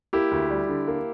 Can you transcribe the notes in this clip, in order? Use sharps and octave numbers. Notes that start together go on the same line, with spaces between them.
A#3 E4 G4
D2
G3
D3
A#3